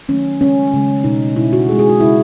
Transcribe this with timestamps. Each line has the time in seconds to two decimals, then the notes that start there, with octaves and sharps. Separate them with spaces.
0.08 D#3 F#3 A3 C#4
0.41 C#3 G#3 C#4
0.73 C#3 G#3
1.04 B2 A3 D#4
1.36 B2 E4
1.39 A3
1.53 F#4
1.68 C#3 G#4
1.72 G#3
1.79 G#4
1.89 F#4
2.00 G#3 E4
2.04 C#3